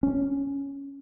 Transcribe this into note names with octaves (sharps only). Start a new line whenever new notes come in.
C#4